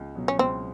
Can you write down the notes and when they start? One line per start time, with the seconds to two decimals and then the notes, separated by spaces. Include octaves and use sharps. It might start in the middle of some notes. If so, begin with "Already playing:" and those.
Already playing: C#2
0.15 B2 F#3
0.28 C#4
0.39 C#2 C4